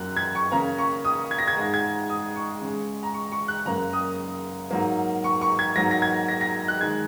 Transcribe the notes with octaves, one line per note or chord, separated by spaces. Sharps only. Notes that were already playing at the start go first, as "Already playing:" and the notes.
Already playing: F#2 F#3 A#3 F#6
G#6
C#6
C#3 A#3 A#5
C#6
D#6
G#6
A#6
G#6
G#2 G#3
G#6
D#6
C#6
C#3 G#3
A#5
C#6
C#6
F#6
F#2 C#3 A#3 A#5
D#6
G#2 F#3 A#3
C#6
C#6
G#6
G#2 F#3 A#3 A#6
A#6
G#6
A#6
A#6
F#6
D#3 G#3 G#6